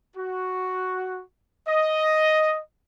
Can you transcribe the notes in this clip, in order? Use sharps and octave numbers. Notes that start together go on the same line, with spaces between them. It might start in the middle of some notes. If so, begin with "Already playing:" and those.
F#4
D#5